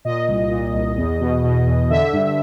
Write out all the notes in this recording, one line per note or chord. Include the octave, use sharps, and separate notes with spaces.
A#2 D#5
C2
A#2
C2
E2
B2
B2
E2
D3 E5
G2